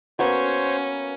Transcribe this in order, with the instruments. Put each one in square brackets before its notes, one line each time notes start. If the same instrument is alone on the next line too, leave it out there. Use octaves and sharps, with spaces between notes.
[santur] A#3 B3 F#4 [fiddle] C#4 [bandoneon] C5 C#5